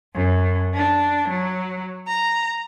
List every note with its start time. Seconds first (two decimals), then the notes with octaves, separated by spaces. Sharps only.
0.14 F#2
0.74 D4
1.29 F#3
2.07 A#5